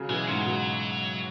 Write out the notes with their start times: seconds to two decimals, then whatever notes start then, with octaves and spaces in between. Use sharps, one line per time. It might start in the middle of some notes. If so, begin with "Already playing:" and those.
Already playing: C#3 F#3
0.09 B2 E3 G#3
0.28 G#2 C#3 F#3
0.46 B2